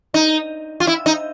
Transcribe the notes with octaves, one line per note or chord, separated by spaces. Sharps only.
D#4
F4
E4
D#4